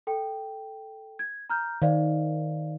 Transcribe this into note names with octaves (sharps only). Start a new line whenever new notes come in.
A4 G5
G#6
A#5 F6 G6
D#3 C5 D5 F5